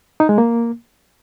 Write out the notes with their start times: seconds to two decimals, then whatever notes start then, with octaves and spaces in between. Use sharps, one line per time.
0.20 D#4
0.29 G#3
0.38 A#3